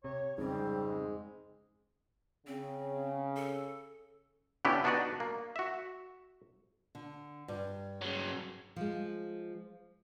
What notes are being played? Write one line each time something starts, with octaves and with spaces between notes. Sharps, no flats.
C3 C#5
F2 G#2 C#3 G3 C4
G#3
C#3 C4
A4
D3 B3 C#4 D4 E4 G4
B3 D4 D#4 F#4 B4 D5
A#3
F#4 E5
D3
G2
C#3 F#3
F3 G#3